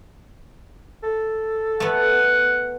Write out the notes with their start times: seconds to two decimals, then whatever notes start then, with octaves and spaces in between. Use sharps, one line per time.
1.03 A4
1.80 A3 B3 F#5